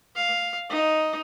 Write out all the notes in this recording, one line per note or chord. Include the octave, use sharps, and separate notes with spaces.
F5
D#4